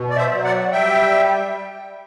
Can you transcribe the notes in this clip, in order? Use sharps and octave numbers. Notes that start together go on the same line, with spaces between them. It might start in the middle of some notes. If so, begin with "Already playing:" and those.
Already playing: B2
D5
C5 E5
F#3
D5 F#5
G3 E5 G5